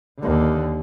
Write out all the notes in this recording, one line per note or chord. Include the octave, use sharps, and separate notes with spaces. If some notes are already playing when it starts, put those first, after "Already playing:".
D#2 D3